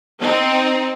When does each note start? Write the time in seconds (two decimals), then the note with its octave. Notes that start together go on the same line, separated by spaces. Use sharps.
0.21 C4 D#4